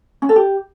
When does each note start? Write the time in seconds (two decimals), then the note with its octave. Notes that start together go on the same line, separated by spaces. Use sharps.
0.22 C#4
0.29 A4
0.36 G4